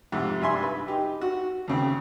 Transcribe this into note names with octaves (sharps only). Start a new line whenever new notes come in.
F2 G#2 C3
G2 G3 E5 G#5 C6
B4
D#4 G4
F#4
D#2 C#3 C4